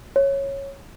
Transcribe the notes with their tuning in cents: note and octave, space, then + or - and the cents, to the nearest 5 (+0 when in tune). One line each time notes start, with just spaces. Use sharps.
C#5 -10